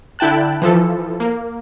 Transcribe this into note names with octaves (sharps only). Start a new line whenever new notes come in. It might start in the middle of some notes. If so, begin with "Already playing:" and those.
D3 E4 G5 A5 F#6
E3 F3 A4
A#3